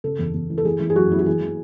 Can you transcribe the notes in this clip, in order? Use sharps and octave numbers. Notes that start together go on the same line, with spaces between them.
C#3 A4
E2
E2
E3
A4
E3 G#4
E3
G#4
F#2 F#4
F#2 E4
F#4
E3 G#4
E3